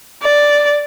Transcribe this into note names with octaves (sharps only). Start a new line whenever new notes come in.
D5